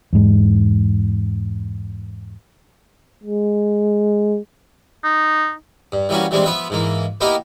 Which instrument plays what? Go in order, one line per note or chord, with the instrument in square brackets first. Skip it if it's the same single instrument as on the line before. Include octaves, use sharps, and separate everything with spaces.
[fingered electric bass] E2 G#2
[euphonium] G#3
[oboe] D#4
[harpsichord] G2
E3 G3 A#3 C#4 F#4
E3 G3 G#3 C4 D4
F3 B3 B4 E5
G#2 E3 A#3
A#3 B3 D#4 E4 G4 A#4